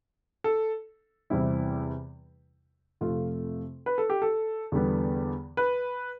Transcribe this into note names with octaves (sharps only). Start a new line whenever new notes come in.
A4
E2 C3 E3 G3 C4 E4
F2 C3 F3 A3 F4
B4
A4
G4
A4
E2 D3 G3 B3
B4